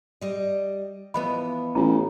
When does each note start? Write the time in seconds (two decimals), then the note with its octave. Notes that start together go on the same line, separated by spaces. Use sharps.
0.21 G3 D#5
1.14 E3 F3 B3 C5 D#5 B5
1.75 A1 F4 A#5